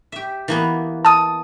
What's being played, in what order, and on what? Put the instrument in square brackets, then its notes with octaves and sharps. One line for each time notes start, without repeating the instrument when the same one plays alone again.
[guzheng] G4 E5
E3 A#3 B3
[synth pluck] A5 D#6